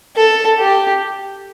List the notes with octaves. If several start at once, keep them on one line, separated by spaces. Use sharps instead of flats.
A4
G4